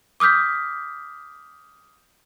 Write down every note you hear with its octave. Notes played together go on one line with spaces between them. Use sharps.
D6 D#6 F6 G6 B6